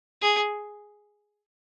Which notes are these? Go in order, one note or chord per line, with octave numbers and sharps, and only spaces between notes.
G#4